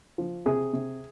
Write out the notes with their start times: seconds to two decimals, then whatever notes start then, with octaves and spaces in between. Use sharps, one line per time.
0.18 F3
0.46 C3 G#4
0.73 C3